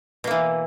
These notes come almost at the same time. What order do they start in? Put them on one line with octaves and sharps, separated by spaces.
B2 A#3 E3